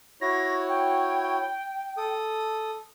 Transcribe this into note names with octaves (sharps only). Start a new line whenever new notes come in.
E4 F#4 C#5 A#6
G5
A4 D#6